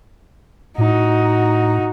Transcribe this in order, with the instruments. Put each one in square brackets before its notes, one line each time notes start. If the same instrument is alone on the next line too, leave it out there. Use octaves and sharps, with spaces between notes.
[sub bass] A2 [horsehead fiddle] D#4 F#4